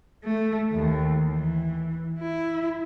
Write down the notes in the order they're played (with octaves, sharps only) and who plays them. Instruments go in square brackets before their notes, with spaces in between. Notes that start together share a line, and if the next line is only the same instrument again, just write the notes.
[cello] A3
D#2
E3
E4